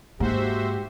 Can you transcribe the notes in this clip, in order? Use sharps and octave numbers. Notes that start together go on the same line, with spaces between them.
G#2 A#3 F#4 G4 C5 E5